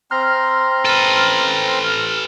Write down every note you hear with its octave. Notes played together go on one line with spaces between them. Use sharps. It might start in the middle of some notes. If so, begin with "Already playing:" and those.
C4 A#5 C6 F6
A4 B4